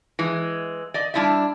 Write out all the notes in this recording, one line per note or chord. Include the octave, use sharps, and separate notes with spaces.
E3 G#3
D5 D#5
G3 D4 E4 D5 E5